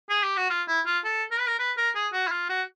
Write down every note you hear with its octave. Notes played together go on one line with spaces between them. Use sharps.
G#4
G4
F#4
F4
E4
F4
A4
A#4
B4
A#4
B4
A#4
G#4
F#4
E4
F4
F#4